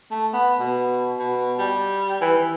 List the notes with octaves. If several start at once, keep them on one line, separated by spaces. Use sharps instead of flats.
A3
B3
B2
B2
G3
E3
E3